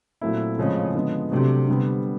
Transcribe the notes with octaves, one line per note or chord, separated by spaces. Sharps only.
A#2 F#3 A3 C4 E4
A2 C#3 F3 G#3 C4
D3 F3 G#3 B3
C3 F#3 A3 D4
D3 G3 B3